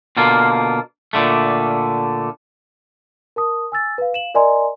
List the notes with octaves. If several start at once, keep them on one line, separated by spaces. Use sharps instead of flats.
B2 D3 A#3 F4
A#2 D3 A3
A#4 A5 D#6
G#5 E6 A6
B4 F5
F5 E7 F#7
A#4 D5 D#5 G#5 A#5 C6